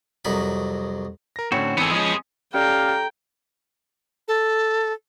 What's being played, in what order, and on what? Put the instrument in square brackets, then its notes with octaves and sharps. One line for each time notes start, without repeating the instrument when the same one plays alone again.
[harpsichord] C2 F2 F#3 D#4 A#4 B5
[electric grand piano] A#4 A#6
[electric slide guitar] A2 C4 F#4 [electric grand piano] D3 C#4 C#5
[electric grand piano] G#1 C#7 D#7 [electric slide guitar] E3 C4 A4 [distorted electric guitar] B3 G#4
[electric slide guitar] F3 G#3 C#4 [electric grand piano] D#5
[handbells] C#4 G4 D5 [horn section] A4 A#5 [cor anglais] F5 [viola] G5
[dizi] A4